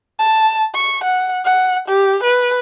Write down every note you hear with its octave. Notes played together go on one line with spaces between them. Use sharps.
A5
C#6
F#5
F#5
G4
B4